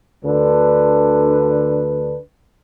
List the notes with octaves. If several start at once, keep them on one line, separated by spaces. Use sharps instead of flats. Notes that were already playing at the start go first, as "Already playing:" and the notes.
D2 D3 D4 B4